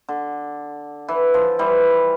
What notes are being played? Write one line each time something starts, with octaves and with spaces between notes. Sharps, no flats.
D3
E3
F3
E3 G3